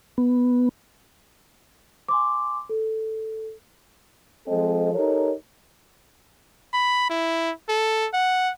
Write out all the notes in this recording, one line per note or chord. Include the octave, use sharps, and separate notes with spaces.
B3
G#5 C6 D6
A4
F3 G#3 C4 A4 D#5
D#4 G4 A4 A#4 C#5
B5
E4
A4
F#5